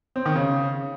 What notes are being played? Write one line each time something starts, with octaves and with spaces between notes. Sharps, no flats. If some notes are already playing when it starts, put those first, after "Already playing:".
C4
D#3
C#3